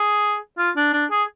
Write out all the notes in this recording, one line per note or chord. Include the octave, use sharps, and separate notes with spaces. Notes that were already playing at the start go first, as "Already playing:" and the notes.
Already playing: G#4
F4
D4
D4
G#4